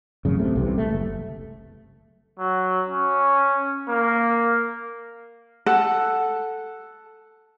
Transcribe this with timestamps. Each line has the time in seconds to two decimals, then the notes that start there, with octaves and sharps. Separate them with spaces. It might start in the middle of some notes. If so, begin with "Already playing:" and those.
0.25 A1 F#2 C#3
0.40 C3 A3
0.56 C2 C3 E3
0.78 A3
0.90 F#1
2.39 F#3
2.89 C#4
3.89 A#3
5.66 A4 F#5